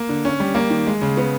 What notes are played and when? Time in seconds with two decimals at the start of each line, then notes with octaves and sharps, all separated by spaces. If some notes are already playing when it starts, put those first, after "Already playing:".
Already playing: A#3
0.09 D3
0.25 C#4
0.40 G3
0.55 A#3
0.70 D#3
0.87 G#3
1.02 C#3
1.17 B3